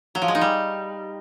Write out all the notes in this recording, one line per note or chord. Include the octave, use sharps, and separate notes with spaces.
F#3
F3
G#3
D#4
G3